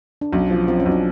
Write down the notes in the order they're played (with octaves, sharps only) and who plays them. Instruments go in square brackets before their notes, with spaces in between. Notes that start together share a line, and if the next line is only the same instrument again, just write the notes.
[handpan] D4
[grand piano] B1 [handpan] C#4
[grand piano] F3
[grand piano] F3 [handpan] C4
[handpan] C#4
[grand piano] B1
[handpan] D4